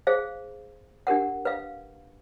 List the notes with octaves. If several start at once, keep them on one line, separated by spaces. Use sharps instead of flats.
G#4 C5 F5
D4 G4 A#4 F#5
B4 F5